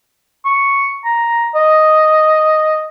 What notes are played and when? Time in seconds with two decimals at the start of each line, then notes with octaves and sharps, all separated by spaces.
0.46 C#6
1.05 A#5
1.55 D#5